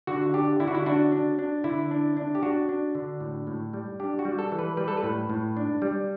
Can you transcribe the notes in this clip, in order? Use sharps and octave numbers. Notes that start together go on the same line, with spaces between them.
D3 F#4
D4 G4
D3 E4
F#4
E4
D4 F#4
D4
D4
D3 E4
D4
D4
G4
D4 F#4
D4
D3
A2
A2
G3
D4 G4
F#4
G3
A4
E3
B4
G3 B4
A4
B4
A2
A2
D4
G3